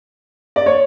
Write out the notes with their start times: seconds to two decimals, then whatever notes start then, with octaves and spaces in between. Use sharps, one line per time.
0.56 D5
0.66 C#5